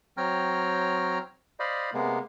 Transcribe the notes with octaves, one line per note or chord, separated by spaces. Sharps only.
F#3 C4 C#5 G5 A#5 F6
C5 D5 D#5 F5 B5
C3 G#3 A#3 B3